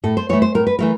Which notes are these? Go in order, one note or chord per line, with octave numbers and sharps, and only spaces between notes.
A2 A4
C5
E3 A3 C#5
C5
A2 A#4
B4
E3 A3 A#4